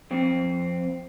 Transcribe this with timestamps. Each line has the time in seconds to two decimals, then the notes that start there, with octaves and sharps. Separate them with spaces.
0.11 F2 C4